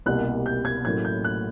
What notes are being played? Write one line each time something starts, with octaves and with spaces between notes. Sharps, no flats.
C2 B2 G3 A#3 F#6
G6
G#6
A1 A2 F#3 A#3 G#6
G6
F#6